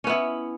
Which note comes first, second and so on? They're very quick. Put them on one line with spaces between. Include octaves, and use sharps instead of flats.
C#4 B3 E4